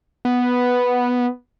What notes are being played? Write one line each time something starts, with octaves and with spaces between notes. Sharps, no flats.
B3